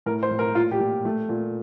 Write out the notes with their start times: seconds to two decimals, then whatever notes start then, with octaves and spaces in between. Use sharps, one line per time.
0.06 A2 A#4
0.23 C5
0.31 A2
0.39 A#4
0.55 A#2 F4
0.71 G4
0.80 A#2
1.05 A3
1.29 A#2